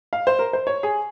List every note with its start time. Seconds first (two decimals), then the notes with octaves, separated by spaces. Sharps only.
0.13 F5
0.27 C5
0.39 A#4
0.53 C5
0.67 C#5
0.83 G#4